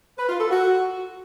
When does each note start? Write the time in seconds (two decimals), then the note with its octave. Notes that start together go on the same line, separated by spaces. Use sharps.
0.18 B4
0.29 F4
0.40 A4
0.51 F#4